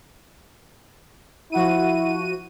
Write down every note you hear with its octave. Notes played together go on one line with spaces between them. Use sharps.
F3 E4 F#4 D#7